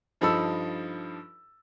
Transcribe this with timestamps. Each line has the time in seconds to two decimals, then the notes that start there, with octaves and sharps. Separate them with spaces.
0.21 G2 F3 D#4 A4 B5 E6